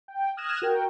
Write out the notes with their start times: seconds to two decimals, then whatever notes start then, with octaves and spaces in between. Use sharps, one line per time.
0.08 G5
0.37 D#6 F6 F#6 G#6 A#6 E7
0.62 F#4 A#4 G5